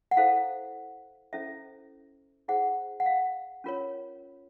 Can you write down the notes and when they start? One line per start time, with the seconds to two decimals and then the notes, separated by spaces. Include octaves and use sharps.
0.11 F#5
0.17 E4 A4 C5 F5
1.33 C#4 E4 A4 C5 E5
2.48 E4 G#4 C5 F#5
3.00 F#5
3.06 F5
3.64 C#4 F4 A#4 C#5